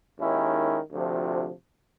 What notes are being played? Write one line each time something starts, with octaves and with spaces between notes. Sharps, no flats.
D#2 D#3 G#3 C#4 E4
D2 C3 F3